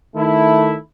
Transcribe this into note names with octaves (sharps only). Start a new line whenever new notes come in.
D#3 A3 E4